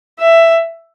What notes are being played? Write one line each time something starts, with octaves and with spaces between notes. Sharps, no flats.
E5